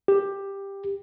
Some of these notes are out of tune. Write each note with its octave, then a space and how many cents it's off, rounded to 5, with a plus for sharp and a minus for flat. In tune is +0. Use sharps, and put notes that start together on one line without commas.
G4 +10